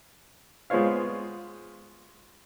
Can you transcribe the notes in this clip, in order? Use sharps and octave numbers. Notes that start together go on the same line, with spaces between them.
G#3 B3 F4 C5 C#5 F5